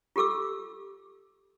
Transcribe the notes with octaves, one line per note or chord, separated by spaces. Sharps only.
F4 G4 A4 D6 E6